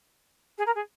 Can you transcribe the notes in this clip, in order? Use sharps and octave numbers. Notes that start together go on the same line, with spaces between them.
G#4
A#4
G#4